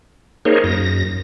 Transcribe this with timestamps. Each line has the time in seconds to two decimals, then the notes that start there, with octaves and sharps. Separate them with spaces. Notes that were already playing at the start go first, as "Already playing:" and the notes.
0.45 A#3 D#4 G#4 A#4 C5 C#5
0.64 F#2 A#6